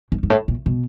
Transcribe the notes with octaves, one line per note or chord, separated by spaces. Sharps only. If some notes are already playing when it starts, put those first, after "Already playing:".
G#2
G#2
A2
A#2
B2